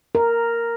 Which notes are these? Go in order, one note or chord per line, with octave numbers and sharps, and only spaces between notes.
A#4